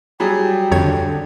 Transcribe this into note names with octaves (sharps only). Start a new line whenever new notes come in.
F#3 G3 G#4 G5
F2 D3 C#5 G#6